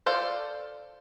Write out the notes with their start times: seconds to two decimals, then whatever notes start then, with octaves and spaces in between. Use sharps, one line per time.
0.06 F4 A4 C5 D5 F5